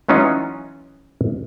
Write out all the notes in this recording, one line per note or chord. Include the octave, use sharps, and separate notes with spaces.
E3 F#3 C#4 D#4 F4